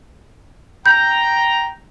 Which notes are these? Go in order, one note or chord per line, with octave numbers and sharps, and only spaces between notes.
G5 A#5 G6